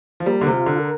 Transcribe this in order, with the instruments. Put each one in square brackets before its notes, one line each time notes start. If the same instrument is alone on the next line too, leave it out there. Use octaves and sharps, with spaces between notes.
[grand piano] F3
[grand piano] G3 [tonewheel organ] A#3
[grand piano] D3
C3
[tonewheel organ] F4
[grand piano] D3
[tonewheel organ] A#4